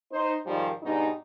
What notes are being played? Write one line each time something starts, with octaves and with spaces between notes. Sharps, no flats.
D#4 C5
G#2 D#3 F3 G3
G#2 B2 G3 D4 D#4